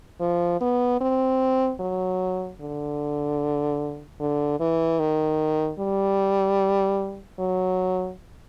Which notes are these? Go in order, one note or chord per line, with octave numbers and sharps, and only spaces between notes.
F3
B3
C4
F#3
D3
D3
E3
D#3
G3
F#3